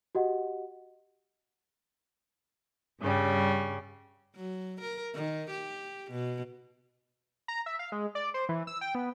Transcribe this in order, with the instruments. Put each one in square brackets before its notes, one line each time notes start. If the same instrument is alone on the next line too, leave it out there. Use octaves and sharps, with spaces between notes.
[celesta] F#4 G4 D#5 F#5
[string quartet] G2 C#3 G3
[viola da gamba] F#3
A#4
D#3
G4
B2
[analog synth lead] A#5
E5
F5
G#3
D5
C5
E3
E6
G5
B3